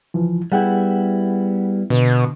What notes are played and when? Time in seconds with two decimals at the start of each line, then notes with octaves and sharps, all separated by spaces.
0.14 C#2 E3 F3
0.52 G3 B3 E4 G#4 F#5 G5
1.90 B2 D3